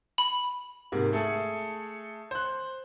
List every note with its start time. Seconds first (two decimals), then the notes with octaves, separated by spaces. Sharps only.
0.18 B5
0.92 G#2 C3 A#3
1.13 A3 G#4 A4
2.31 C5 F#6